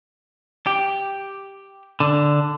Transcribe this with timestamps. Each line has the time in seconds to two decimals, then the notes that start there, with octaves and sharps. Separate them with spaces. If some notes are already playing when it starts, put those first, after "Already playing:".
0.67 G4
2.00 D3